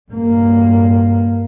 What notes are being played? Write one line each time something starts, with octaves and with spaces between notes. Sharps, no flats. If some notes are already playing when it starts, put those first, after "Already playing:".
G2 A#3